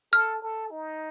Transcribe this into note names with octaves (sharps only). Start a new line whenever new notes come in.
A4 F6
A4
D#4